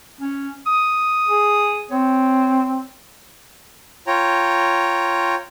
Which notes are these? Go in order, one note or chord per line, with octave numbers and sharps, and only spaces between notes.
C#4
D#6
G#4
C4 C#5
F4 C#5 G5 A#5